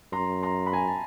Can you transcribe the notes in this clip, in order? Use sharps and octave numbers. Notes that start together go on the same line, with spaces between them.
F#2 A#5 C6
A#5 C6
B5
G#5 A#5
A5